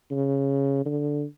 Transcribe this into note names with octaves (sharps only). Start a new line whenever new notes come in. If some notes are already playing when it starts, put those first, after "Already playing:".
C#3
D3